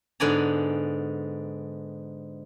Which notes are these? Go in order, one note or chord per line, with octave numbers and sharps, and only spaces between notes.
G#2 D3 B3 D5 G#5 A#5